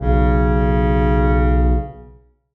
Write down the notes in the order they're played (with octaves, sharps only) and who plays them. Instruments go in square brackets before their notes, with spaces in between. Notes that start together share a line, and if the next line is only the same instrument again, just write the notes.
[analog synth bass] B1 [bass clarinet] C#3